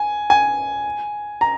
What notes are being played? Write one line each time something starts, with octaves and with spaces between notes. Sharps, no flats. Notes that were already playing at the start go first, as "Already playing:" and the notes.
Already playing: G#5
G#5
A#5